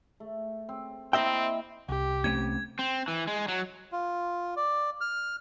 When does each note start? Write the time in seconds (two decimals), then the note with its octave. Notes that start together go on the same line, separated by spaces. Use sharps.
0.20 A3
0.69 C4
1.13 A#3 C4 E4 D#5 E5 G5
1.89 C2 G4
2.24 A3 C4 C#4 G#6
2.79 C4
3.08 E3
3.27 G#3
3.48 F#3
3.92 F4
4.57 D5
5.01 F6